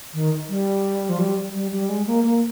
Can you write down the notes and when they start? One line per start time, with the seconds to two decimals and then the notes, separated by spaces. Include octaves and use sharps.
0.13 D#3
0.48 G3
1.09 F3
1.18 G3
1.54 G3
1.71 G3
1.89 G#3
2.06 A#3
2.24 A#3